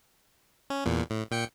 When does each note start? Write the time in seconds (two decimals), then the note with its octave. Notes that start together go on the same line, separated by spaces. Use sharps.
0.70 C#4
0.85 E2 A#2
1.10 A2
1.31 A#2 G5 C#7